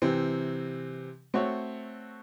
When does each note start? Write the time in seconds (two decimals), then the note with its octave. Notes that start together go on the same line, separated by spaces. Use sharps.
0.02 C3 E3 C4
1.34 A3 C4 F#4 C#5